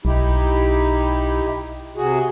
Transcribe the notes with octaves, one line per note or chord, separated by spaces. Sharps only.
B1 D#4 E4 G4
C3 F#4 G#4